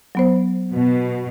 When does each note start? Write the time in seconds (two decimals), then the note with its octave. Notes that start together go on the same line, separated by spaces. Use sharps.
0.15 F#3 B3 C5
0.72 B2